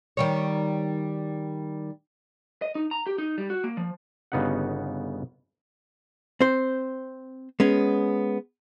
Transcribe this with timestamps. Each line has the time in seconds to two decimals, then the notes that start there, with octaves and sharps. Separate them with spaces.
0.17 D#3 G3 C#5
2.62 D#5
2.75 D#4
2.91 A#5
3.07 G4
3.18 D#4
3.38 G3
3.50 F#4
3.64 A#3
3.77 F3
4.32 G1 C#3 B3 D#4 G4 F#5
6.41 C4 C5
7.60 G#3 B3 C#4